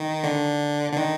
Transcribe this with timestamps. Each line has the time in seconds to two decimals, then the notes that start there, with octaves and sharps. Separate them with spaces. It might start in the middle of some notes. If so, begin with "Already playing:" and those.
Already playing: D#3
0.24 D3
0.92 D3
0.97 D#3